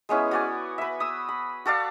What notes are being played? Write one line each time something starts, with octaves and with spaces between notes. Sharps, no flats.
G#3 B3 C#4 E4
F#4 D5 G#5
B4 E5
D#6 E6
B5
F#4 A4 D5 F5